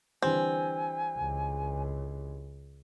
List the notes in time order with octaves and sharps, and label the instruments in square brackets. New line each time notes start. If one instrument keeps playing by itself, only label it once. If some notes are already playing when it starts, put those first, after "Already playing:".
[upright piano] D3 E3 G3 [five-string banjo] C4 [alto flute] G#5
[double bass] C#2